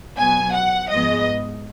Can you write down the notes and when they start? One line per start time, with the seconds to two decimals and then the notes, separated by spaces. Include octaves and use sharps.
0.18 B2 F#3 B3 G#5
0.54 F#5
0.91 G#2 F3 G#3 B3 D#5